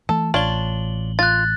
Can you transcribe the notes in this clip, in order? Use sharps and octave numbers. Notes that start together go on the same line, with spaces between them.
E3 A3 A4
A1 D4 F4 C#5 F#7 G7
F4 F#6 A6